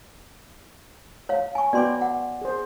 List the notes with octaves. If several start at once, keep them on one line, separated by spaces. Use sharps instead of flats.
C#5 F5
G#5 C#6
B3 F#4 D5 G5 C6 D6
F#5
G#4 C5